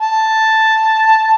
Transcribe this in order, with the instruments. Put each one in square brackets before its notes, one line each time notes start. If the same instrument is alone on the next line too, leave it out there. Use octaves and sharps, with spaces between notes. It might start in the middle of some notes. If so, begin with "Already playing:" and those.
[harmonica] A5